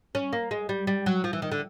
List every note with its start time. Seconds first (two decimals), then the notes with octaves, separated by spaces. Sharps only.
0.15 C#4
0.33 A#3
0.51 G#3
0.69 G3
0.87 G3
1.06 F#3
1.24 F3
1.33 E3
1.42 D#3
1.52 D3